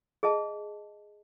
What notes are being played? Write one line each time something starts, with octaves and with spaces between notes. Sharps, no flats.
G#4 D#5 E5 A5